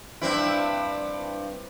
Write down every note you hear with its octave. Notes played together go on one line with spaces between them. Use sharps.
G2 C4 E4